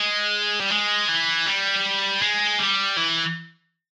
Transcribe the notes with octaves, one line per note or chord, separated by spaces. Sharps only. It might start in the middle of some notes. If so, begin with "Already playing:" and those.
Already playing: G#3
G3
G#3
E3
G3
G#3
G3
E3